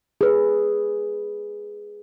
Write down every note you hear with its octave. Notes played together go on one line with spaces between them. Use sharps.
G#4 B4